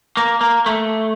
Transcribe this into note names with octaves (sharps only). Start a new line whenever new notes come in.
A#3
A#3
A3